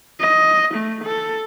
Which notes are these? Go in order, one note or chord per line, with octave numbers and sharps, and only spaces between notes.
D#5
A3
A4